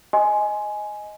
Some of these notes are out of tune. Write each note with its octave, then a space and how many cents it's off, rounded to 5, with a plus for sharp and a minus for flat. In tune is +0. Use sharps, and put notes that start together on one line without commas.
D#5 +0 G#5 +10 C6 +0